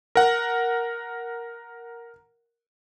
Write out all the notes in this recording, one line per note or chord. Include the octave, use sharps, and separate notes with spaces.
A#4 F#5